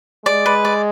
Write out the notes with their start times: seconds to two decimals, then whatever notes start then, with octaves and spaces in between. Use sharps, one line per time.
0.25 G#3 D5
0.46 B4
0.65 D5